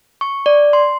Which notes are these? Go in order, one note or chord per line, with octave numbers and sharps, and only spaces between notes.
C#6
D5
C6